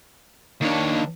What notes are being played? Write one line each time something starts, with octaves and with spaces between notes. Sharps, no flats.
D#3 A#3 D4 C#5